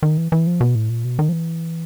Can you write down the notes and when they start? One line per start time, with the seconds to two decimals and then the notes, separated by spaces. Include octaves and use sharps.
0.03 D#3
0.17 E3
0.32 E3
0.47 F3
0.61 B2
0.75 A2
0.89 A#2
1.05 B2
1.19 D#3
1.29 F3
1.33 E3